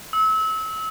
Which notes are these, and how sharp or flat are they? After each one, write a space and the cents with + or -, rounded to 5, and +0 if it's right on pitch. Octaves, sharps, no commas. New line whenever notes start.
E6 -30